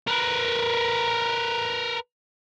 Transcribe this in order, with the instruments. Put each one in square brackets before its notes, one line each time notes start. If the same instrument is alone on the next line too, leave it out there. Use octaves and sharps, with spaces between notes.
[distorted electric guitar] A#4 B4